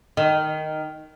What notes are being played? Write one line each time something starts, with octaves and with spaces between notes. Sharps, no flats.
D#3